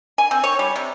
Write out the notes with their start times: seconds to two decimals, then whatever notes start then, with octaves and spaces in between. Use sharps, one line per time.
0.18 G#5
0.31 C4
0.44 C#5
0.59 G3
0.76 C3